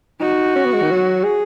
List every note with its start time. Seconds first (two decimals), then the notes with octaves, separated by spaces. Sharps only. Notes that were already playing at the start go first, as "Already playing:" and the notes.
0.21 D#4 F#4
0.56 C#4
0.65 B3
0.73 G#3
0.82 D#3
0.91 F#3
1.25 G#4